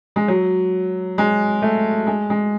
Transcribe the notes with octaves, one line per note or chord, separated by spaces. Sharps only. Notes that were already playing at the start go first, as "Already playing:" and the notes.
G#3
F#3
G#3
A3
G#3
G#3